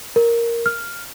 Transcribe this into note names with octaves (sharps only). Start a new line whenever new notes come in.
A#4
F6